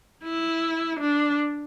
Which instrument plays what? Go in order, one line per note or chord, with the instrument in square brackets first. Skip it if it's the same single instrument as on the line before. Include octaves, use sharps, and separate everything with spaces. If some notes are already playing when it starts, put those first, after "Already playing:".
[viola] E4
D4